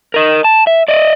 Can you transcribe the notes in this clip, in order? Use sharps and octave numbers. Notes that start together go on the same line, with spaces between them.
A#4 D#5
A5
E5
D5 D#5